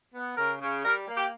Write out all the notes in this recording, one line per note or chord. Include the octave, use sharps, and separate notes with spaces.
B3
C#3 A#4
C#3
G3 A#4
A#3
G4